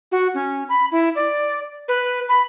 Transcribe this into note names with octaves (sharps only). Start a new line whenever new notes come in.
F#4
C#4
B5
E4
D5
B4
B5